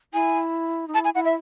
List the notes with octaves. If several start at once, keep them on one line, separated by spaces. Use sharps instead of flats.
E4 G#5
D#4
E4 A5
G#5
E4 F#5
E5